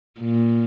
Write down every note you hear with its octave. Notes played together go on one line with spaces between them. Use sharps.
A#2